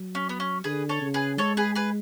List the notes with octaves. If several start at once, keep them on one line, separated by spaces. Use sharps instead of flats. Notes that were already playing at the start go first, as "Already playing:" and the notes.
Already playing: F#3
C#4
B3
C#4
D3 G#4 B4
A4 C#5
C#3
G#4 B4
G#3 A4 C#5
G#4 B4
G#4 B4